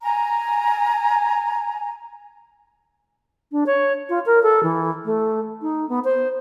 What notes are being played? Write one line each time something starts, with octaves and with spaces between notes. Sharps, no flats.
G#5 A#5
D4
C#5
F4
A#4
A4
E3
A3
D#4
B3
C5